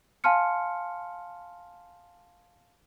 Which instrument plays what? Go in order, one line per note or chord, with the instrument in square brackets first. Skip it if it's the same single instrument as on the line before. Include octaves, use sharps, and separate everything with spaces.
[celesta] F5 G#5 A5 C6 F6 C#7